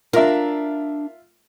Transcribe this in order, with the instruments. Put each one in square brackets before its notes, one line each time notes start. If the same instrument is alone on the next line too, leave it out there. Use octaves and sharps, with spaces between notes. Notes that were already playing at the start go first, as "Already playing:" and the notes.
[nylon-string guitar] D4 F5 [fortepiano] F4 E5 [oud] A#4